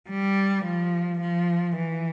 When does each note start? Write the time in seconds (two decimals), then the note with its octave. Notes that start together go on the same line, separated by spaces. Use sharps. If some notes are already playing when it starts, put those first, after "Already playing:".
0.10 G3
0.65 F3
1.21 F3
1.77 E3